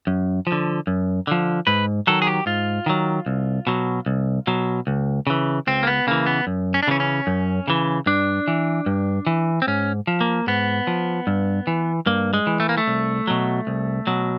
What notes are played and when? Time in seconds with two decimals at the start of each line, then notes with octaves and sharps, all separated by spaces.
0.07 F#2
0.47 F3
0.52 D3
0.87 F#2
1.27 D3 F3
1.67 G#2 B4
2.07 D#3 F#3 A4
2.22 G#4
2.27 G4
2.46 G#2 F4
2.86 D#3 F#3
3.26 C2
3.67 B2 F#3
4.06 C2
4.47 B2 F#3
4.87 C#2
5.27 C#3 E3
5.67 C#2 C4
5.83 A#3
5.87 B3
6.07 C#3 E3 A#3
6.26 B3
6.47 F#2
6.74 C#4
6.83 D4
6.88 C#3 E3 C#4
7.00 C#4
7.27 F#2
7.68 C#3 E3
8.06 G2 D4
8.48 E3
8.86 G2
9.27 E3
9.62 C4
9.67 G#2 C#4
10.07 F3
10.21 A#3
10.47 G#2 B3
10.87 F3
11.27 G2
11.67 E3
12.06 G2 A#3
12.34 G#3
12.47 E3
12.60 A3
12.69 A#3
12.78 A3
12.88 C2
13.27 B2 F#3
13.67 C2
14.07 B2 F#3